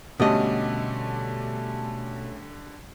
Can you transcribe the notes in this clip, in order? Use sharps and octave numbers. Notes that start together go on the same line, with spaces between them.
B2 D3 G3 A3 C#4 G4 D#5